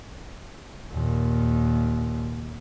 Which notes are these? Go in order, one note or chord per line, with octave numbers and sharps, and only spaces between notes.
D#2 A#2